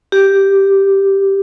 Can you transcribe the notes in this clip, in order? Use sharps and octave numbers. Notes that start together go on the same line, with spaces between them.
G4